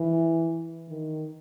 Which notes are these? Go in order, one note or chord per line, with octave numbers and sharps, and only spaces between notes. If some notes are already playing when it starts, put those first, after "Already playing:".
Already playing: E3
D#3